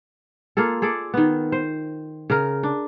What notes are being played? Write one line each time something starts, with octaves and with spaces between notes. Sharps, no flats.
A#3 F4 G#4 A4
G#4 A4 D5
D#3 B3
C5
C#3 A#4
D4